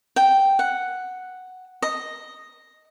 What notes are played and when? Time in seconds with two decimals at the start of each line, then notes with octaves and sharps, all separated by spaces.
0.16 G5
0.59 F#5
1.82 D#5